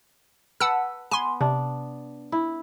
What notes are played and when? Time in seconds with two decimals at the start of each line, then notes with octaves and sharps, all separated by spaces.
0.60 B4 F#5 A5 E6
1.11 B3 G#5 C6
1.41 C3 D4
2.32 E4